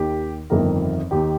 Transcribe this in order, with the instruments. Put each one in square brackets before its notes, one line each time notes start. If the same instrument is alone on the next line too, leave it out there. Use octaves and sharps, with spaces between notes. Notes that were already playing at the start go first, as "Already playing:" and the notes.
Already playing: [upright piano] D#2 D#3 G4
G1 F2 D#3 A#4
D#2 D#3 G4